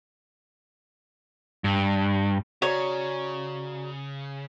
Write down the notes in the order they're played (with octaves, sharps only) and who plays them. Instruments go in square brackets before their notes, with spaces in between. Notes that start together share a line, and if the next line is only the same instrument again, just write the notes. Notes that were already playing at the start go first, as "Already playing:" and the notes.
[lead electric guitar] G2
[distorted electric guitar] C#3 [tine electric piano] F#4 D5 A#5 [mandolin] C#5